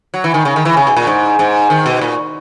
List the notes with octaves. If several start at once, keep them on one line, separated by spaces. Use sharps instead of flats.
F#3
E3
D#3
C#3
D#3
E3
C#3
B2
A#2
G#2
G#2
D#3
B2
A#2